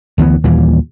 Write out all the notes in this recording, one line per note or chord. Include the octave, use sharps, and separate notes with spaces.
D2 E3 G#3 B3
D#2 A#2 E3 G3